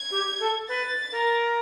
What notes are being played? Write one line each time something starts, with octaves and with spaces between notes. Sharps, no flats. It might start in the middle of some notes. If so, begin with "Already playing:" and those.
Already playing: G#6
G4
A4
B4 A6
A#4